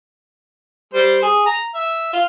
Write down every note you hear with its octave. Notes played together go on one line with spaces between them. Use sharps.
G3 C5
G#4
A#5
E5
F4